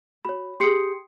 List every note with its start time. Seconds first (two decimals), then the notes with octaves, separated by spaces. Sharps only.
0.25 F#4 C#5 B5
0.60 G4 G#4 C6 C7 C#7